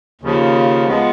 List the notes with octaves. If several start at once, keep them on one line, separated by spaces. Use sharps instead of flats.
D#2 C#3 F3
F3 G#3 B3